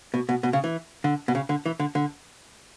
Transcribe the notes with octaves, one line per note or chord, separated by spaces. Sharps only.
B2
B2
B2
C#3
E3
D3
B2
C#3
D3
E3
D3
D3